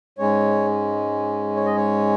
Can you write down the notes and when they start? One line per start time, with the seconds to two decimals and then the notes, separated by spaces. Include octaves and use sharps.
0.18 G#2 G#3 C#4 C#5
1.56 C#5
1.66 D#5
1.77 C#5